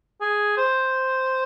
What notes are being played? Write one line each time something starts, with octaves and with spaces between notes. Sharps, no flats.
G#4
C5